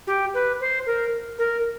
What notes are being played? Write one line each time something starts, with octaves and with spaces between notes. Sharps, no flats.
G4
B4
C5
A#4
A#4